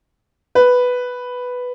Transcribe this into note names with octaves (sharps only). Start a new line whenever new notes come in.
B4